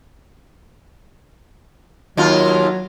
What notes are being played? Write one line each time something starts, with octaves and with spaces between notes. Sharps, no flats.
D#2 F#3 F4